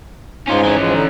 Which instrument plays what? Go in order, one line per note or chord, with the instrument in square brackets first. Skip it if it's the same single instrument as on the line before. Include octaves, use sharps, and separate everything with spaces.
[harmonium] G#2 D#4 G#5 [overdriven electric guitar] C#4 F4
[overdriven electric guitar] E3 C#4
[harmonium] G#2 F3 G#3
D3 D#4